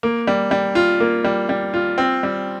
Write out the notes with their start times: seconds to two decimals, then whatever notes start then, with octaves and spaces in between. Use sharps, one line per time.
0.03 A#3
0.27 G3
0.51 G3
0.75 F4
1.00 A#3
1.24 G3
1.49 G3
1.74 F4
1.98 C4
2.23 G3